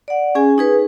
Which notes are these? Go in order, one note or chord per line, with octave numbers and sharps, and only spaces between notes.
D5 F#5
C#4 G#4 G#5
D#4 G#4 B4